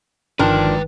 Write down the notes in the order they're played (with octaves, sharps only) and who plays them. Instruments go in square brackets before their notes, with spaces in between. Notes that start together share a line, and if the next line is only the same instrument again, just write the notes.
[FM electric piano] G1 D#3 [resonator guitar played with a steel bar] F3 D4 A#4 [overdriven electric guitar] B4 G5